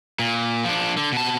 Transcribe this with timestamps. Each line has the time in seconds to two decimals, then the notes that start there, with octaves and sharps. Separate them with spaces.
0.19 A#2
0.64 F3 D4
0.97 D3
1.12 B2 A5